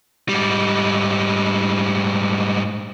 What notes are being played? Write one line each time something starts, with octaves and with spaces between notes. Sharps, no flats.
G#2 G3